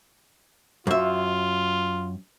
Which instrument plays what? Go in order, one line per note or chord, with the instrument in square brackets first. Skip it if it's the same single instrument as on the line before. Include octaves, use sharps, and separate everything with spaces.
[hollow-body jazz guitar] F#2 E5 [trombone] F4